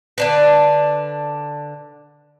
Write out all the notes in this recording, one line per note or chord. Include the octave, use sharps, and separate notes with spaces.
D3 D4 B4